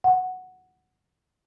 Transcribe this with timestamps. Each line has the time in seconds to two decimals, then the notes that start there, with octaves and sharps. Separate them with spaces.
0.04 F#5